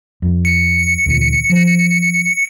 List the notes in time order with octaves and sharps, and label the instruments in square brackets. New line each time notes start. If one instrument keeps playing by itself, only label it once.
[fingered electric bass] F2
[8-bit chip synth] C#7
[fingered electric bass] D2 A#2 E3
F3